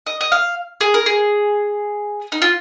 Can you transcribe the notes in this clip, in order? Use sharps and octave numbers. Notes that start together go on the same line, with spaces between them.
D#5
D#5
F5
G#4
A#4
G#4
D#4
F4